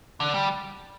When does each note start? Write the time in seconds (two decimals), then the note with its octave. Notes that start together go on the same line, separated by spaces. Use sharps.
0.20 D3
0.34 G3